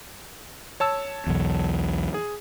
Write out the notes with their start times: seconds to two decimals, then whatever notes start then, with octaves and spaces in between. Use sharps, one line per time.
0.80 C#5 A5 E6
1.27 B1 E2
2.14 G#4